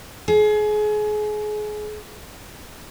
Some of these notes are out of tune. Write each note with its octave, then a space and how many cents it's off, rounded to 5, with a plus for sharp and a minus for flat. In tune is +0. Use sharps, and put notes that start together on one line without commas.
G#4 +30